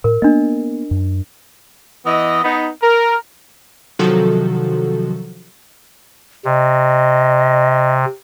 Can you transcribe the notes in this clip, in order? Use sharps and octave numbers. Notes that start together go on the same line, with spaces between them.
A2 A#4
A#3 B3 D4 D#5
F#2
E3 B3 D#5
B3 D#4
A#4
C3 D#3 F3 F#3 F#4 A4
C3 D#5